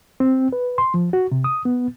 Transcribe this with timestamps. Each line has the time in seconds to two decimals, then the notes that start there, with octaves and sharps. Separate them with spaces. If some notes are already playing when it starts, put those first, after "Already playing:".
0.20 C4
0.53 B4
0.78 C6
0.94 F3
1.13 F#4
1.32 C3
1.44 D#6
1.65 B3